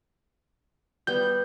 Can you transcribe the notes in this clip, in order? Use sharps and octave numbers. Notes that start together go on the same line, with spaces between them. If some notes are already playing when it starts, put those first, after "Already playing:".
G3 B3 G6